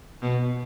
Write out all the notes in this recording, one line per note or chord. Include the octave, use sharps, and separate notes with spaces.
B2